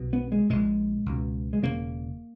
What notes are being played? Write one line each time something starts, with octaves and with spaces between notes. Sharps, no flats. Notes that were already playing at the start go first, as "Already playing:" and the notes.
Already playing: B1 B2
B3
G#3
A#1 A#2 G#3
C#2 B2
G#3
E1 D#2 C#3 A#3